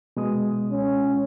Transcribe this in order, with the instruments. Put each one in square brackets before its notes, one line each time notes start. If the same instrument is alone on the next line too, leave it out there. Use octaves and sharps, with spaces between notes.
[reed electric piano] B2 G#3 D#6
[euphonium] C#4